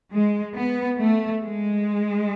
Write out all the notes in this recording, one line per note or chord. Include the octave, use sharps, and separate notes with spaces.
G#3
B3
A3
G#3